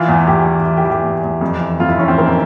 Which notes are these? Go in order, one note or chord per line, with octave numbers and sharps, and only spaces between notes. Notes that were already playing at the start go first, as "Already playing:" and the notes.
Already playing: E3 F4
E2
E2 G4
E3
E3
G4
E3
G4
E2
E2
F2
E3
F2 F4
E4
E3 C#4
C4
F2 A#3
C4